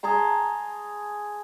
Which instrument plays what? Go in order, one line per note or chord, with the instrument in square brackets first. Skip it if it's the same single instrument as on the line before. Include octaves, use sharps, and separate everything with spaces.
[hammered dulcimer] G#4 A5 A#5 C6